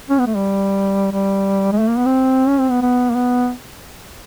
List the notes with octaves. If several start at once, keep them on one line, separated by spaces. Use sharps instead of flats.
C#4
B3
A3
G3
G3
G#3
A3
A#3
B3
C4
C#4
C4
B3
B3
A#3
B3